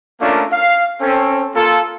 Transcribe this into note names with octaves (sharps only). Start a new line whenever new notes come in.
A3 A#3 C#4 D4 F4 A#4
F5
C4 C#4 A4
A#3 F4 A4